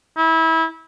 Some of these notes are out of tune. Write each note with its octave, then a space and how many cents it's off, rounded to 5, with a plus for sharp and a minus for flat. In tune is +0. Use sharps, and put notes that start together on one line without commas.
E4 -25